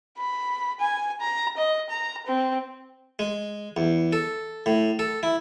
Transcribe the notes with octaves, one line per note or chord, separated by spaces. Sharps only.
B5
G#5
A#5
D#5
A#5
C4
G#3
E2
A4
A2
A4
E4